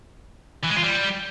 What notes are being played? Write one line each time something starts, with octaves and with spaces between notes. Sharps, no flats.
E3
G#3
F4
G3